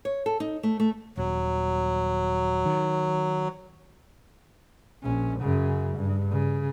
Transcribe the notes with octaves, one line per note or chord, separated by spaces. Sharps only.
C#5
A4
D#4
A3
A3
D#1 F#3
D#3
A#1 C#4
F#2 C#3
G2
C#3